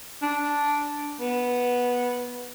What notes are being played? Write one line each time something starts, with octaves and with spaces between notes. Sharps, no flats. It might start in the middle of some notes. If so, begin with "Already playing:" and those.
D4
B3